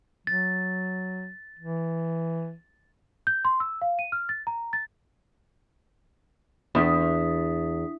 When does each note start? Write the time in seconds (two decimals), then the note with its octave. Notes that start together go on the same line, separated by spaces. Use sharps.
0.27 F#3 A6
1.59 E3
3.27 G6
3.45 C6
3.60 E6
3.82 F5
3.99 D#7
4.12 F6
4.29 A6
4.47 A#5
4.73 A6
6.75 E2 D4 D#6 B6